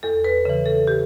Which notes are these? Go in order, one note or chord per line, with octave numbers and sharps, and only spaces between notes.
E2 A4
B4
C#3 E3
A4
G4